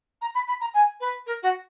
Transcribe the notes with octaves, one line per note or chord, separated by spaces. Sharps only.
A#5
B5
B5
A#5
G#5
B4
A#4
F#4